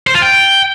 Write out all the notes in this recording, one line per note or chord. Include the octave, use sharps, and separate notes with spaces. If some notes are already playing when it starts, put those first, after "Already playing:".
C5
F4
G5